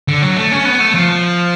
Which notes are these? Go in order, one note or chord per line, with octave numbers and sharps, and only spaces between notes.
D3
F#3
A3
C#4
B3
A3
F3